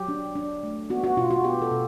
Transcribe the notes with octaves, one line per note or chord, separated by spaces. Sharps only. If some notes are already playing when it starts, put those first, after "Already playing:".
Already playing: F#3 G4
D4
D4
A3
B3 F#4
F#4
B2 F4
F#4
B3 G4
A4
B2